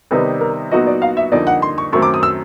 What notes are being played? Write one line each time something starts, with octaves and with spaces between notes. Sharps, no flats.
C3 D#3 G3 B3 D#4 B4
A#4
A#2 F#3 B3 D#4 F#4 D#5
D5
F5
E5
F2 D3 G3 A#3 D#4 D5
F#5
C6
C#6
F#2 D#3 F#3 A3 C4 C#6
D6
D#6
E6